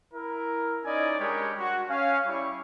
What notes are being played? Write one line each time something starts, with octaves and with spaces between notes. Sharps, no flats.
E4 A#4
C#4 D#4 E4 D5 D#5 G#5
G3 G#3 D4 G4 A#4 C#5
F#4
C#4 F5
G3 E4 G4 C#5 C#6